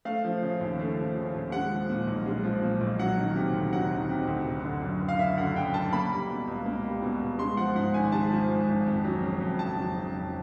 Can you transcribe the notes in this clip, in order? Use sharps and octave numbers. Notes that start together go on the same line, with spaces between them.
A3 F5
F3
C#3
D#2
A3
F3
C#3
D#2
G#3 F#5
F3
A#2
B1
G#3
F3
A#2
B1
F#3 F#5
D#3
C3
D2
F#3 F#5
D#3
C3
D2
F#1
D3
F#2
F#1
F5
F#1 E5
D3 F#5
F#2 G5
F#1 A5
A#3 B5
G3
B2
C#2
A#3
G3
B2
C#2
G#3 C6
F3 F#5
G#2 F#5
G#1 G#5
G#3 A5
F3
G#2
G#1
F2
F#3
C#3
F2
F2 A5
F#3
C#3
F2